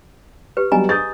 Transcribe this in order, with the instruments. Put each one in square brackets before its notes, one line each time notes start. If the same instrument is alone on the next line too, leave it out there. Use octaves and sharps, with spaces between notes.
[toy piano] G4 B4
[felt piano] F#3 G3 B3 [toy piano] D#5 G#5 A#5
[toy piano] G#4 [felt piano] D#6 G6 A6